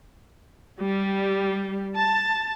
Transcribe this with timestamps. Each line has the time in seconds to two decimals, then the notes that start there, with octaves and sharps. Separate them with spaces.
0.80 G3
1.95 A5